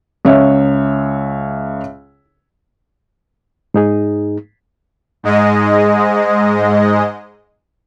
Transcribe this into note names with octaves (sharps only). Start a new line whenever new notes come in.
C#2 C#5 E5
G#2 D#4 G#4
G#2 G#3 D#5